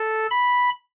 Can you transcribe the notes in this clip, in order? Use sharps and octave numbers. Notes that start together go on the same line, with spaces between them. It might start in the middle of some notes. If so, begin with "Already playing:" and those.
Already playing: A4
B5